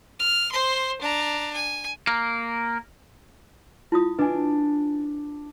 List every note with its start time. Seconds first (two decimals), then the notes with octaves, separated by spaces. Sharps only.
0.19 F6
0.52 C5 C6
1.01 D4 A#5
1.54 G#5
2.07 A#3
3.92 E4 F4 D#6
4.19 D4 B4 D#5 G#5